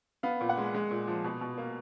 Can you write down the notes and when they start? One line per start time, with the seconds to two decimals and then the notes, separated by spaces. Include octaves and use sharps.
0.23 B3 F5
0.41 A#2
0.49 F#5
0.58 G#3
0.74 G#3
0.91 A#2
1.08 F3
1.24 B2
1.41 B2
1.58 A#3